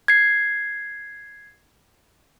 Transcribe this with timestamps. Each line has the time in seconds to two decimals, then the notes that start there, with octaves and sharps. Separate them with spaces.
0.08 G#6 C7